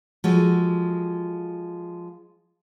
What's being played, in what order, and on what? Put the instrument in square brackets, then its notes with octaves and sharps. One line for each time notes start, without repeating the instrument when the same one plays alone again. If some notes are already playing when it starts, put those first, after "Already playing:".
[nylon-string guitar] F3 G#3 F#4 A4